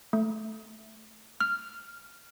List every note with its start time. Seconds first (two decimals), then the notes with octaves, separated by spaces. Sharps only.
0.13 A3
1.41 F6